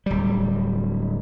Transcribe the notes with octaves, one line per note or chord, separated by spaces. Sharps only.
D1 G3